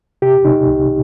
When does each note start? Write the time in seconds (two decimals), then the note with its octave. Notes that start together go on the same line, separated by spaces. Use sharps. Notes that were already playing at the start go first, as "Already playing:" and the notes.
0.22 C3 G4
0.45 C3 D#4
0.67 C2